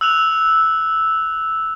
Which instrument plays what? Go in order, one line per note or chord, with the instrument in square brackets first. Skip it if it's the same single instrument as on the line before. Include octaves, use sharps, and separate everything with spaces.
[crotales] E6 F#6 F7